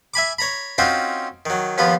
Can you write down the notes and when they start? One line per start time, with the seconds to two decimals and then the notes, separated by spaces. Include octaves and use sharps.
0.14 E5 G#5 B5 D6
0.38 C#5 A#5 B5
0.78 C4 C#4 D#4 F4 F#4 C5
1.46 D#3 F#3
1.78 D#2 F3 B3 F4